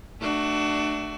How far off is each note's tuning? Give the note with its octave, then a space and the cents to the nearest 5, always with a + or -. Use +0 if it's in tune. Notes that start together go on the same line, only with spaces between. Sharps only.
A3 +0 D4 +25 F#4 +25